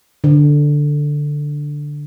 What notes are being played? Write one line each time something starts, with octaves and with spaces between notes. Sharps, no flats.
D3